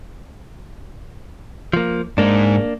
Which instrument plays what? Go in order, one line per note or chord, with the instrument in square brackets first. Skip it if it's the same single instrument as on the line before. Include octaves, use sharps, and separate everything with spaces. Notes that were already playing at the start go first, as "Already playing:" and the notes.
[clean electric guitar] F3 A#3
[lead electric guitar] G#2 G#3 [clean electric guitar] A#3 D4